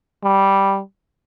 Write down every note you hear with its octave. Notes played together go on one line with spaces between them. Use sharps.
G3